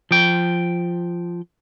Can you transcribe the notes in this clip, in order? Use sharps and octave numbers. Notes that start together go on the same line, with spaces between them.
F3 G5